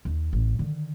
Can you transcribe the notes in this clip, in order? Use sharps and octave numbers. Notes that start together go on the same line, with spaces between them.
D#2
A1
D3 D#3